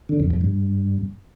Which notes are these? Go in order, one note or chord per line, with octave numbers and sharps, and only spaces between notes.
D3
F2
F2
G2